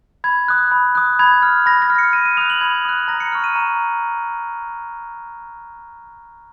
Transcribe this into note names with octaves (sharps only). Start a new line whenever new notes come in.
B5 G#6
D#6 F#6
B5
D#6 F#6
B5 G#6
F6
B5 A#6
A#6
F6
C#7
B5 D#7
D#7
D#6 F#6 F7
F#7
B5 G#6
D#6 F#6
A#5 A#6
C#7
C#6 F6
D#7
A#5